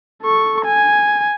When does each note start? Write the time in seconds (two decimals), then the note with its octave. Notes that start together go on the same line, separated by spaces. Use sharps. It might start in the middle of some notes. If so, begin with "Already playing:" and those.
0.22 A4 C#6
0.65 G#5